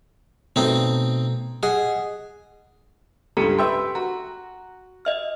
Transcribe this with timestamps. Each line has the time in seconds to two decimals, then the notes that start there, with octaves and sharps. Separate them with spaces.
0.56 B2 A3 C4 D#4
1.63 G#4 D#5 F#5
3.37 C#2 G2 G4 A4 A#5
3.58 B4 E5 G5 C6
3.95 F#4 A#5
5.05 D#5 E5 F6